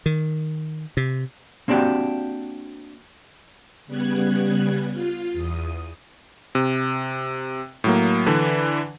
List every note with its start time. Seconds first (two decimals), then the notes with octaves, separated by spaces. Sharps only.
0.06 D#3
0.97 C3
1.68 A#3 C4 D4 F#4 G4
3.87 C#3 G3 B3 F#6 G#6
4.93 F4
5.33 E2 D#6
6.55 C3
7.84 A2 F#3 A#3
8.27 D3 E3 D4 B4